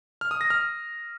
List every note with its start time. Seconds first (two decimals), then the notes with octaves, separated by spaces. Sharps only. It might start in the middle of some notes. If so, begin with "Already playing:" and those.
0.21 F6
0.31 D#6
0.41 A#6
0.50 F6